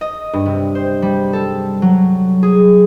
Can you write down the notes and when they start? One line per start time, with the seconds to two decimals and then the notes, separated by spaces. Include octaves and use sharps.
0.01 D#5
0.33 G2
0.46 C3
0.75 C5
1.02 G3
1.33 A4
1.82 F#3
2.43 G#4